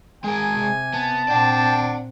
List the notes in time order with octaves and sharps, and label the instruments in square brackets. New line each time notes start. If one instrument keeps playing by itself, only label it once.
[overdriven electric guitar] G#3 A#4 [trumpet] G#4 [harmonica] G#5
[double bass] C3
[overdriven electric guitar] B3 [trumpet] A5
[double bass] A#2 C4 [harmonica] D4 G5 [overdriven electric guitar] D5 F#5